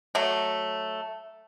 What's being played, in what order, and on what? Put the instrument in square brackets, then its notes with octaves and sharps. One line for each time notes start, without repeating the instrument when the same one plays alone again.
[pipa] F#3 A3